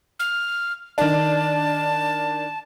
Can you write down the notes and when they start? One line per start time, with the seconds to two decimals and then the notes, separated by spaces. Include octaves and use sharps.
0.19 F6
0.98 D#3 D4 A5